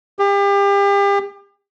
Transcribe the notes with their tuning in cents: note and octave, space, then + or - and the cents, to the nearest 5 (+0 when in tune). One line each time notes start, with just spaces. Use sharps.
G4 +35